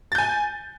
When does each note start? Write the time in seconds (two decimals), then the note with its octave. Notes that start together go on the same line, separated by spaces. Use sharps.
0.12 A6
0.15 G6
0.18 G#5